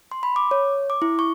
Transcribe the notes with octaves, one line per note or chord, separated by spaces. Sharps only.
C6
B5
D6
C#5
D6
E4
C#6